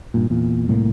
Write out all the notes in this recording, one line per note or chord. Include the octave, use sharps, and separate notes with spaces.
G2 A#2
E2 A#2
C2 A2 A3 A#3